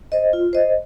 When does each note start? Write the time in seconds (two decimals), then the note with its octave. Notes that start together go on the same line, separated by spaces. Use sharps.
0.12 C5 D#5
0.33 F4
0.53 C5 D#5